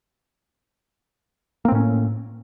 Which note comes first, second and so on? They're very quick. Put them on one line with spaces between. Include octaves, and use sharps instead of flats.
A#3 C4 A2 C#4